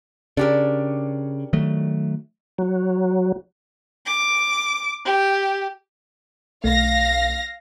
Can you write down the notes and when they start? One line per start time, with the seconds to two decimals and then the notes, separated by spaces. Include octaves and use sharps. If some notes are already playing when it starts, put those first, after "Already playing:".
0.37 C#3 D4 G4 A#4
1.53 D#3 F#3 A3
2.58 F#3
4.06 D6
5.06 G4
6.64 B1 A3 F5 A#6